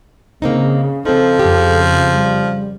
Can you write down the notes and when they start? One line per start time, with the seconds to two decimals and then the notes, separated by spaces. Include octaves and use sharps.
0.42 C#3 A#3 C4 D#4
1.05 F3 C4 D#4 A4
1.39 F2 C#3 G4
2.13 G3